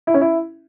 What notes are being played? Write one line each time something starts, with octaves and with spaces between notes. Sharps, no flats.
E4
C#4
E4